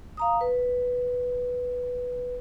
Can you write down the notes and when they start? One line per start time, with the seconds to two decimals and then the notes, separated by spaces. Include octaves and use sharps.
0.17 F5 A#5 D#6
0.41 B4